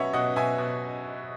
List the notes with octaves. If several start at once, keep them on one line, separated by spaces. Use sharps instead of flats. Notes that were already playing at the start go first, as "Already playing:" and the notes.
Already playing: B2 F#3 C#4 B4 C#5 D#5 E5 F#5
B2 D#5 F#5
B2 E5 G#5
B2